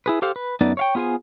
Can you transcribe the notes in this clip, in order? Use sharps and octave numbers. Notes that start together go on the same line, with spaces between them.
E4 G#4 B4
G4 A4 C5 F5
B4
F#2 A3 B3 D#4 B4 D5
C#5 F5 G5
B3 F4 G#4 C5 G#5